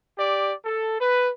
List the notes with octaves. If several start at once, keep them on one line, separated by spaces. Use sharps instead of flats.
G4 D5
A4
B4